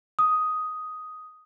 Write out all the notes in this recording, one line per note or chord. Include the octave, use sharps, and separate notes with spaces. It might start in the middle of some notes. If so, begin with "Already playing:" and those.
D#6